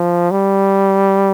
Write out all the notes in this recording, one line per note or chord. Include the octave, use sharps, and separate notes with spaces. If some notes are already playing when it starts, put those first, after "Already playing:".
Already playing: F3
G3